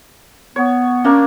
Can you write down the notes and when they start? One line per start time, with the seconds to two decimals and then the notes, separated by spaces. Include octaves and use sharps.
0.56 B3 C#5
1.05 A#3 C#4 D4